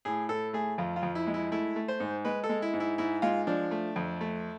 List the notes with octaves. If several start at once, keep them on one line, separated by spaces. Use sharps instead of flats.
A2 G#4
A2 A4
A3 G#4
F2 F4
F4
F2
E4
G#3
E4
A3 E4
A3
C5
G#2
G#3 B4
A4
G#3
E4
G#2
E4
G#2 E4
G#3 F4
F3 D4
A3
F2
A3